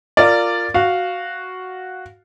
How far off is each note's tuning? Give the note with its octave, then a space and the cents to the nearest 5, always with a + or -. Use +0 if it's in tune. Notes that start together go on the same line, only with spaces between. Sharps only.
F4 +0 A#4 -20 D5 +0
F#4 +0 F5 +0